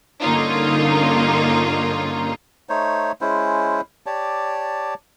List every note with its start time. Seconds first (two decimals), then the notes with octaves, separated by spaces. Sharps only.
0.21 G2 D3 A#3 C#4 D#4 F4
2.69 A3 D#4 C5 C#5
3.21 G#3 C#4 E4 C5
4.06 G4 C#5 D5 A5